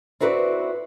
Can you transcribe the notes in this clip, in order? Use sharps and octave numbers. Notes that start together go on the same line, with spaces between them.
C4 E4 F#4 B4 C5 D5